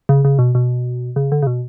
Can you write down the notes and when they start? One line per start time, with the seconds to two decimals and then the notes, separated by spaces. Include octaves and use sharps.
0.09 C#3
0.24 C#3
0.39 B2
0.55 B2
1.16 C#3
1.32 D3
1.42 C#3
1.47 B2